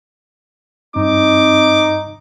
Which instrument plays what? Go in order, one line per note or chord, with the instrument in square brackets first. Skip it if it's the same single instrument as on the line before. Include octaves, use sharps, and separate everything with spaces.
[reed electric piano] G2 [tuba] C4 [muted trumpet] D#4 [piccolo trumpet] D6